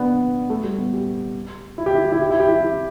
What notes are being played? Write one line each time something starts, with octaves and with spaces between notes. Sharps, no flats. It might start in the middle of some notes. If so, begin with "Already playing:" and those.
Already playing: B3 D4
A3
G3
B3
G4
E4
G4
E4
G4
E4
G4
E4
G4
E4
E4